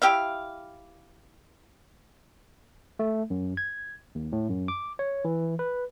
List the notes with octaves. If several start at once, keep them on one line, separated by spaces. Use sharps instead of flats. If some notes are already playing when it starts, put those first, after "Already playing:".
E4 G4 E5 F5
A3
F#2
G#6
D#2
A2
F#2
D6
C#5
E3
B4